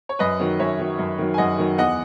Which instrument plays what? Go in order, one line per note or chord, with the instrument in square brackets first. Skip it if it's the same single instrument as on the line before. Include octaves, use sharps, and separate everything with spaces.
[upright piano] C#5
F#2 B4 D#5
D#3 F#3
F#2 C#5 E5
D#3 F#3
F#2
D#3 F#3
G#5
F#2 D#5 F#5
D#3 F#3
E2 D#5 F#5